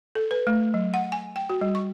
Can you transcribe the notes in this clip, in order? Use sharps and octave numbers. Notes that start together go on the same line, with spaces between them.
A4
B4
A3
F#3
F#5
G#5
G5
F#4
G3
C#6